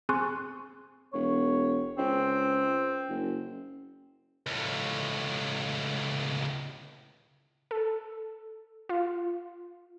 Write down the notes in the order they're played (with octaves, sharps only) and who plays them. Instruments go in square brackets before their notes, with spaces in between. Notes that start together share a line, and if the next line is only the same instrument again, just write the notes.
[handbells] C4 G#4 G#5 C6 C#6 F#6
[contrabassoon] E1 [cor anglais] C#5
[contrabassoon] C#2 [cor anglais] C4
[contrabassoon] F#1
[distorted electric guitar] C#2 A2
[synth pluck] A4
F4